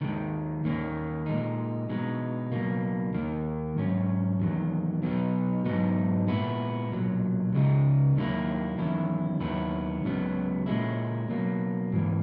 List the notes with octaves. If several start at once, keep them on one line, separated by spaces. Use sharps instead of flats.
D#2 D#3 G#3
D#2 D#3 A#3 C#4
A#2 G#3 D#4
B2 G#3 D#4
B1 B2 A#3
D#2 D#3 A#3
G#2 F#3 C#4
E2 D#3 F#3
B2 F#3 B3 D#4
G#2 F#3 B3 D#4
A#2 G#3 B3 E4
B1 A#2 F#3
C#2 C#3 G#3 D#4
D#2 D#3 F#3 A#3 E4
E2 D#3 F#3 C#4 E4
D#2 D#3 F#3 B3 E4
C#2 C#3 F#3 B3
A#2 G#3 C#4 E4
B2 F#3 A#3
G#2 E3 A#3